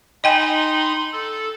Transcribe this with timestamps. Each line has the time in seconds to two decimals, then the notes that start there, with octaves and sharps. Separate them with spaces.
0.24 D#4 D#5 G5 G#5 B5 C6
1.13 A4